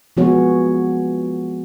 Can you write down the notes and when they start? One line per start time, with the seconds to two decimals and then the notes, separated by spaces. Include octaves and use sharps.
0.17 F3 G#3 B3 F#4 G#4 C#5